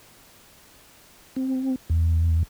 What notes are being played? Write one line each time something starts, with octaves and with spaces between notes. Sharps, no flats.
C4
E2